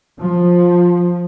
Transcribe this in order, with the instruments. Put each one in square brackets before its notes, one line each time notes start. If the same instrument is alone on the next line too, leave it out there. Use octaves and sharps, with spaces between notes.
[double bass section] F3